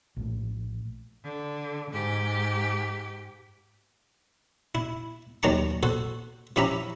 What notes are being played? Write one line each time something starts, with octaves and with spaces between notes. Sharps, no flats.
A#1 A2
D3
G#2 G4
E4
D#2 D#3 F#3 A5 A#5 C#6
F#4 A4 C5
F3 C#4 E4 G4 E5 A#5